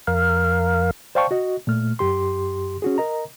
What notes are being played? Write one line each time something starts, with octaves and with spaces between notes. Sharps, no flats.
F2 A#4 F5
C5 D5 F5 G5 A5 C#6
F#4 D#5
A#2 A3 F6
F#2 G4 C6
C#4 F#4 G#4
A#4 D#5 A#5